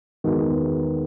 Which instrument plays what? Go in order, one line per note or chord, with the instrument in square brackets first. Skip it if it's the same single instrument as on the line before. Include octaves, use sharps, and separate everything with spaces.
[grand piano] E2 D#3 G#3 B3 F#4